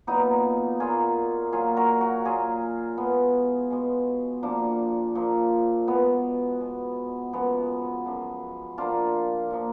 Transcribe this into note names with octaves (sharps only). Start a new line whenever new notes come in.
A#2 F#3 A#3 B3 D#4
A#2 F#3 A#3 F4 G#4
A#2 F#3 A#3 F4 G#4
F#4 A#4
F#4 A#4
A#2 F#3 A#3 F4 G#4
B2 G#3 B3
B2 G#3
A#2 F3 A#3 D4
A#2 F3 A#3
B2 G#3 B3
B2 G#3
F#2 F3 G#3 B3
F#2 F3 G#3
A#2 F3 A#3 D4 F4
A#2 F3 A#3